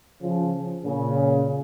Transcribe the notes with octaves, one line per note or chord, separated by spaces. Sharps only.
C#3 F3
A#2 C#3